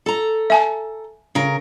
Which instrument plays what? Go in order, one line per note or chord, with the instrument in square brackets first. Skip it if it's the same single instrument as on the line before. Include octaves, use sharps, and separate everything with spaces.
[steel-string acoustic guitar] A4 A#5
[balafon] E5 G#5 A5
[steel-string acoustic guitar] C#3 A#4